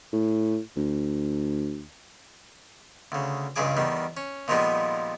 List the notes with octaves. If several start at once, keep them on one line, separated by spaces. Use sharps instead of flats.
A2
D2
D2 C#3
C#2 G2 C#3 G#4 D6
E2 D#3 G3
C#4
A#2 D#3 F3 G3 G#3 B3